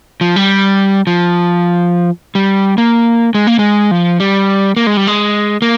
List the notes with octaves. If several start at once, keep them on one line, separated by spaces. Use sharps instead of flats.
F3
G3
F3
G3
A#3
G#3
A#3
G#3
F3
G3
A#3
G#3
G3
G#3
A#3